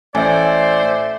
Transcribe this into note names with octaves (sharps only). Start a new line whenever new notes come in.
A1 A2 A3 C5 D5 E5 G#5